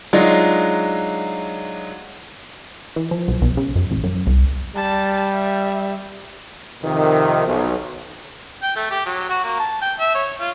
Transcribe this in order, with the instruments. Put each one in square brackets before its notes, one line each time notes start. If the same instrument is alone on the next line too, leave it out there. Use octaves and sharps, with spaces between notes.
[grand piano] F#3 G#3 D4 D#4 F4
[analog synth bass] E3
F3
B1
B1
C#3
F#2
A1
F#2
C2
[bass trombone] G3 [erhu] A5
[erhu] E5
[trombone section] F2 C3 D#3
B1
[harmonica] G5
A3
G4
F#3
F#4
A#3
A5
G5
E5
C#5
F4